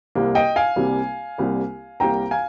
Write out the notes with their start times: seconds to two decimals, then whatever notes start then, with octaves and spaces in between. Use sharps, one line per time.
0.15 C2 C3 G3 A#3
0.35 D#5 G5
0.56 F5 G#5
0.76 C2 C3 G3 A#3
1.38 C2 C3 G3 A#3
2.00 C2 C3 G3 A#3 G5 A#5
2.31 F5 G#5